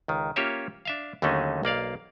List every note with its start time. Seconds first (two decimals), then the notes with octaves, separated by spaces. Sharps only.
0.08 C#2 D#3
0.36 A#3 C#4 F4 G4 C#5 E5
0.85 D4 E5 F5
1.22 D#2 D3 F#3 A3 C#4 D#4
1.63 B1 A#3 D5 F5